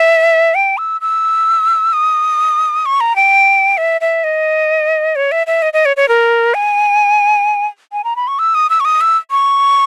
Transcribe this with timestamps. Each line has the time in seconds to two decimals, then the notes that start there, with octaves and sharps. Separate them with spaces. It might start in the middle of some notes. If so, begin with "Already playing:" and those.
Already playing: E5
0.55 G5
0.78 E6
1.01 E6
1.93 D#6
2.86 C#6
3.01 A#5
3.16 G5
3.77 E5
4.01 E5
4.24 D#5
5.16 C#5
5.32 E5
5.47 E5
5.62 D#5
5.73 D#5
5.85 C#5
5.97 C#5
6.09 A#4
6.54 G#5
7.93 G#5
8.04 A#5
8.16 B5
8.28 C#6
8.39 E6
8.55 D#6
8.70 E6
8.80 C#6
8.85 D#6
9.01 E6
9.31 C#6